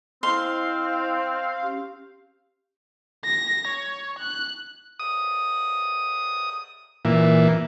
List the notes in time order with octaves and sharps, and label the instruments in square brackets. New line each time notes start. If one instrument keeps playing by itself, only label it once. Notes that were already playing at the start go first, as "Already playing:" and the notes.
[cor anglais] C4 [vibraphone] E4 C5 D#5 [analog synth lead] F5 [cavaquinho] C6
[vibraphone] C#4 G4
[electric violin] A#6
C#5
F#6
[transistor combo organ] D#6
A#2 E3